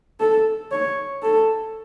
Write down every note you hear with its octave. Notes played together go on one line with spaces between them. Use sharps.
A4
C#5
A4